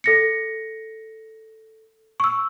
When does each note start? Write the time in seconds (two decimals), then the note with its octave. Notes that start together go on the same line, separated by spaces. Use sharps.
0.04 A4 A#6 C#7
2.20 C#6 E6